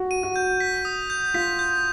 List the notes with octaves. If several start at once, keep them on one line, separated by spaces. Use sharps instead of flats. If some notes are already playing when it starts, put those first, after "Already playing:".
Already playing: F#4
D#7
F#4
G6
B6
D#6
G6
F4 B6
G6